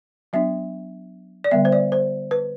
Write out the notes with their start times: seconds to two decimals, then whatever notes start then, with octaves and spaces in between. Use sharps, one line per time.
0.33 F#3 B3 D4 E5
1.44 D5
1.51 D3 G3 B3 E5
1.65 C5
1.72 D5
1.92 C5
2.31 B4